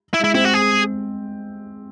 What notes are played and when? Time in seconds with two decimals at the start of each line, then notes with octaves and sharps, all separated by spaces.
0.14 E4
0.20 G#3
0.24 E4
0.34 C4 E4
0.45 F#4
0.54 G#4